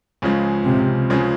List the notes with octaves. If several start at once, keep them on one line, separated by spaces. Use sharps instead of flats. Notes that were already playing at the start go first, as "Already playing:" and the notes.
C#2 C#3 F3 G#3
C3
C#2 C#3 F3 G#3